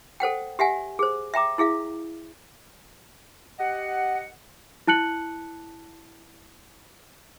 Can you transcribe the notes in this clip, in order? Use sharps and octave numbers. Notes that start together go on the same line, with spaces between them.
A4 C5 F#5 G5
G4 E5 F#5 G#5
G#4 C5
E5 G5 A#5 D6
E4 G#4 E5 F5
G4 D#5 F#5
E4 A5 F#6 C#7 F#7